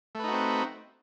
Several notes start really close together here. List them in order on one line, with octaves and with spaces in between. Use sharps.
A3 B4 D#4 F#4 C4